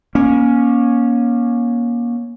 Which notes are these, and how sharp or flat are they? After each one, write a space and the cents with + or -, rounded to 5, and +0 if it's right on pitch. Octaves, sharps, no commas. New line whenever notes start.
A#3 +30 C#4 +0